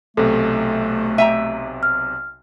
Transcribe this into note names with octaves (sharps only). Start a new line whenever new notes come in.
B1 C3 A3 A4
E5 G5 A#5 D#7
F6